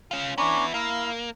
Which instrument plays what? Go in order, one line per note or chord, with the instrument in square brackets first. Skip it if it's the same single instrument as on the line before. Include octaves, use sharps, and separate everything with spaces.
[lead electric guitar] C#4 F4
[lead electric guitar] B3 E4 [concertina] C#4 D4 A#5
[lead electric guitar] A#3 [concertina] E4 F5